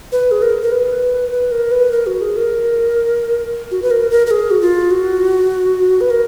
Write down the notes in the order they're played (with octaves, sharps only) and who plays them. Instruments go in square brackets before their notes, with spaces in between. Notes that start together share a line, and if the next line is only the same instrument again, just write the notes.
[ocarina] B4
G#4
A#4
A#4
B4
B4
A#4
B4
A#4
F#4
G#4
A#4
F#4
B4
A#4
A#4
A#4
G#4
F#4
F4
F#4
B4
A#4